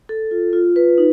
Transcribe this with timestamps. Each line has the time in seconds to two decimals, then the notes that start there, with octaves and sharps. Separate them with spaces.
0.09 A4
0.31 F4
0.53 F4
0.76 B4
0.98 D#4